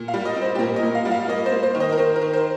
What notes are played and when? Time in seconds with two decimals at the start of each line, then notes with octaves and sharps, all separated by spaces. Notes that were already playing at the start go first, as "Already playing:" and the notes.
Already playing: A#2
0.08 F5
0.14 G3
0.25 D#5
0.36 C4
0.42 C5
0.55 G4
0.59 A#2 A#4
0.76 D#5
0.83 A#2
0.95 F5
1.05 G3
1.11 F5
1.28 A#3 D#5
1.46 C5
1.52 A#3
1.63 C5
1.75 D#3
1.80 D#5
1.92 A#4
1.98 D#3 C5
2.16 A#4
2.21 D#3
2.33 C5